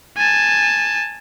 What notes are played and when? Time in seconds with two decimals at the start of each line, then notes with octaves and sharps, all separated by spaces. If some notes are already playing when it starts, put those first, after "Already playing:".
0.17 G#5 A5